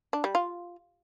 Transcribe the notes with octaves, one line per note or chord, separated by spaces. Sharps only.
D4
G3
F4